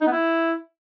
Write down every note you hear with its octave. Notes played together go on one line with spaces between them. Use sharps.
D#4
B3
E4